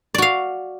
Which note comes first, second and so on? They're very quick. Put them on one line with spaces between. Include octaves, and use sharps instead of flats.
D5 F#4 F5